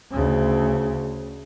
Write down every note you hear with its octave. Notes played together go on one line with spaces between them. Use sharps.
D2 C#3